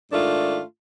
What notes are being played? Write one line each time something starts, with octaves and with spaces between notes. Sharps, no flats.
G#2 D#3 A3 D4 F4